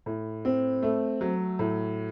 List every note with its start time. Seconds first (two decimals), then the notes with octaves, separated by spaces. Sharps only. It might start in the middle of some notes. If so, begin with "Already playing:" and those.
0.06 A2
0.45 C4
0.83 A3
1.21 F#3
1.59 A2